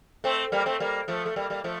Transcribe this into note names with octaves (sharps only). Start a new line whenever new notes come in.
A3 C4
G3 A#3
A3 C4
G3 A#3
F3 A3
A3
G3 A#3
G3 A#3
F3 A3